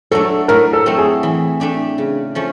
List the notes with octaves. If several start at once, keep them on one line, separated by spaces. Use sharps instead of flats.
F#3 A3 D4 A4
A2 A#4
A4
F#3 A3 C4
G#4
E3
A3 D4 G4
C#3
F3 A3 C#4